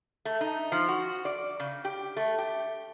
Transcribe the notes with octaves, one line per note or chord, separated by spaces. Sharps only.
A3
D#4
F3
F#4
D5
C#3
G4
A3
G4